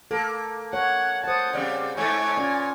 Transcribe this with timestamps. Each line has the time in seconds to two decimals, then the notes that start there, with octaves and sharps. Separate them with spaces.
0.11 A#3 A4
0.73 C#5 F#5
1.24 C5 F#5 A5 D#6
1.53 C#3 G3 C4
1.97 G#2 A3 C#5 G#5
2.37 A#2 C#4